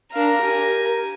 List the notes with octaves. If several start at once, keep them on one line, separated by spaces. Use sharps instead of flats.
D4 A#4 F5
G4 G#5